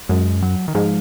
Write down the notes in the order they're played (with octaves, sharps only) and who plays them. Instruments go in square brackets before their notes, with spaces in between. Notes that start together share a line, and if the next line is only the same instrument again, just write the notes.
[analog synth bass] F#2 [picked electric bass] G#3
[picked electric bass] F#3
D#3
[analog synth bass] G#2 [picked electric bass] F3